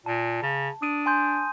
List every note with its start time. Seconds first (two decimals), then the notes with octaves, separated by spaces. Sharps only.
0.06 A#2 A5
0.43 C#3
0.82 D4 D#6 D#7
1.06 G#5 C6 G6